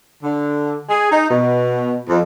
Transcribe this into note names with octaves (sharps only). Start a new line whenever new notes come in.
D3
G#4
D#4
B2
F2